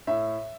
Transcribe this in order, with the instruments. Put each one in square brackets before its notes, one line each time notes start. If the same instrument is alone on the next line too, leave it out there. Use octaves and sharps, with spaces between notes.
[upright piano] A2 E5